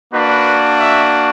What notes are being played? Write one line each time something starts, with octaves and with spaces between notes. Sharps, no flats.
A#3 D4 F#4 B4
E5